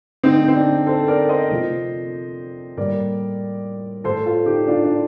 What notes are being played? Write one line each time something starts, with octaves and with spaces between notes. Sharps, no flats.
D3 A3 C4 D#4
C4
D4
A4 C5
A#4 D5
C5 D#5
C3 F3 A3
A2 G3 A#3 A#4 D5
A2 A3 A4 C5
F4 A4
D#4 G4
D4 F4
D4